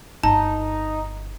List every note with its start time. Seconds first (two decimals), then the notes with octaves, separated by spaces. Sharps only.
0.23 G1 D#4 A5